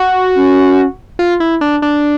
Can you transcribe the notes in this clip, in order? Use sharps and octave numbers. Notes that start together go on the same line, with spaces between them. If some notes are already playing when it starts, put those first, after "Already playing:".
Already playing: F#4
C#4
F4
E4
D4
D4